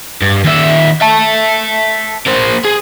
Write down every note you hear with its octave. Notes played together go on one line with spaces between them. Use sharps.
G2
D#2 E5
E5 A5
A#3 C5
G#4